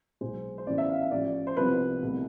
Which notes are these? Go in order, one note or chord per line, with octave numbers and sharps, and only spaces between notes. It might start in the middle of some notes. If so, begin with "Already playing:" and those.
B1 B2 G#3 C5
C5
A1 A2 E3 B3 D5
E5
F5
E5
A1 A2 F3 D5
C5
C2 C3 F3 B3 B4
C2 B2 A3